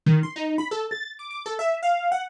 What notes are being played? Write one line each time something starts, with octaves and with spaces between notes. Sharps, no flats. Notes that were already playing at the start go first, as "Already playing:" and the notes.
D#3
C6
D#4
B5
A4
A6
D6
D6
A4
E5
F5
F#5